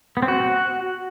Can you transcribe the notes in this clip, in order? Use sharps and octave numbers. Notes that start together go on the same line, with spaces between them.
B3
C4
F#4